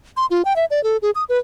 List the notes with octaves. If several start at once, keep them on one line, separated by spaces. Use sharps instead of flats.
C6
F4
G5
E5
D5
A4
G#4
D#6
B4